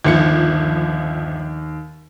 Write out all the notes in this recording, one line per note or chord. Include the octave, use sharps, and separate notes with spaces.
G1 D#2 F3 C#7